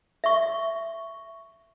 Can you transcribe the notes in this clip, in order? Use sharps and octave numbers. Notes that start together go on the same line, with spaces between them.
E5 C#6